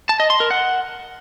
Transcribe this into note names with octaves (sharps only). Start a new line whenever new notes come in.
A5
D#5
C6
A#4
F#5